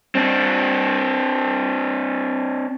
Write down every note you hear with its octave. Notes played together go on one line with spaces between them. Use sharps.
C4 D4